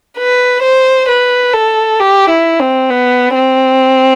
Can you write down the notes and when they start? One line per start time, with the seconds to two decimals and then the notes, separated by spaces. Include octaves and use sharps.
0.18 B4
0.63 C5
1.09 B4
1.54 A4
2.00 G4
2.30 E4
2.60 C4
2.90 B3
3.35 C4